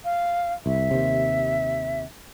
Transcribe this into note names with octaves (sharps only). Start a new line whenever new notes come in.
F5
C2 E5
D#2 C3